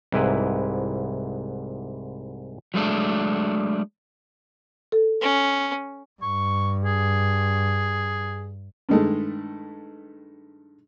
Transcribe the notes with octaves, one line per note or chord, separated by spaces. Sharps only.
C2 G#2 E4 B4
F#3 G#3 A3 D4
A4
C#4
G2 C#6
G#4
G2 D#3 G#3 A3